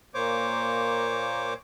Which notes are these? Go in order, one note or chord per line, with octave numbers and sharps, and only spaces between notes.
A#2 A#3 C5 C#5 D6